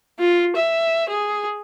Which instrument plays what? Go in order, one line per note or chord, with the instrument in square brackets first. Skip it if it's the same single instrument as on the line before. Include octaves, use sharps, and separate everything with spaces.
[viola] F4
E5
G#4